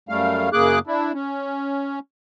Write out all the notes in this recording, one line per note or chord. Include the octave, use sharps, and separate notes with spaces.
F#2 G3 A3 F5
F#2 C#3 A#3 G#4 D6 F#6
D4 E4
C#4